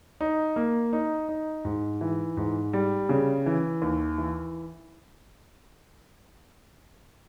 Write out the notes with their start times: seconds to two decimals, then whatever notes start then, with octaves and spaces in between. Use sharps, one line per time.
0.21 D#4
0.56 A#3
0.93 D#4
1.29 D#4
1.65 G#2
2.01 E3
2.37 G#2
2.73 G3
3.09 C#3
3.46 E3
3.82 D#2
4.18 E3